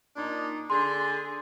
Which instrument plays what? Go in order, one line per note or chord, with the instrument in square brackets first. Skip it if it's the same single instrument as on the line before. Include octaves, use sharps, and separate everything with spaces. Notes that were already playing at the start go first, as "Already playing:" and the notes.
[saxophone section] A#2 D4 D#4
[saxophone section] D3 G#4 [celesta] C6